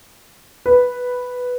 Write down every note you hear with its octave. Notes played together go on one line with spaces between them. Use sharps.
B4